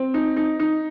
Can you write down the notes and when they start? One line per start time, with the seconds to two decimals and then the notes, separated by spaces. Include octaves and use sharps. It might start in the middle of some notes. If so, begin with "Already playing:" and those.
Already playing: C4
0.14 D#4
0.36 D#4
0.60 D#4